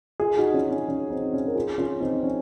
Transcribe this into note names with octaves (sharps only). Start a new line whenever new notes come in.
F4 G#4
D#4 F#4
C#4 F4
C#4
C#4
C4 D#4
C#4
A#4
F4 G#4
C#4 F4
C4 D#4
C#4